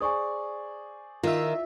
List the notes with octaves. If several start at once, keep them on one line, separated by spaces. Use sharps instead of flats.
G#4 C5 D5 G#5 C#6 D#6
D#3 F4 E5